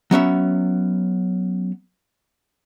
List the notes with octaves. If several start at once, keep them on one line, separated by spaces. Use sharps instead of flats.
F#3 B3 C#4 E5